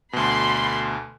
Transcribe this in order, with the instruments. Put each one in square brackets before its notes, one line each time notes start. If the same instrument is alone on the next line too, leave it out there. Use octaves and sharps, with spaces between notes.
[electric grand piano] D2 B2 [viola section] B5 C6